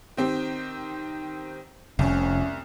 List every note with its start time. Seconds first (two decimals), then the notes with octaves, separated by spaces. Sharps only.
0.17 D#3 C4 G4
1.99 F1 C2 C#4